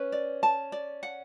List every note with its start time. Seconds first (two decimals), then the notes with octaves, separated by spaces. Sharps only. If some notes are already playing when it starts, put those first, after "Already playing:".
Already playing: C#4 B4
0.12 D5
0.43 A5
0.72 D5
1.03 F#5